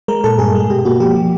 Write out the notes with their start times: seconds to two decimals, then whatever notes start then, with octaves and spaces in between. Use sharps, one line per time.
0.08 G#3 A#4
0.24 A#2 A4
0.39 G2 G#4
0.55 G#3
0.70 B2 G4
0.85 A#3 F#4
1.00 F3 G4
1.16 F3